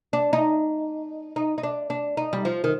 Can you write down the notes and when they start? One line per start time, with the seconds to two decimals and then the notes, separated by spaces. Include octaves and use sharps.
0.13 D4
0.33 D#4
1.36 D#4
1.58 D#4
1.63 D4
1.90 D4
2.17 D#4
2.33 G3
2.45 F3
2.64 D#3